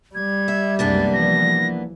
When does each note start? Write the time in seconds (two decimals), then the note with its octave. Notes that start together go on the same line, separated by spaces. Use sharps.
0.15 G3 G#6
0.48 E5
0.79 C2 F#2 G#3 A#3 B3 D4 A6
1.13 E3 F3 A#6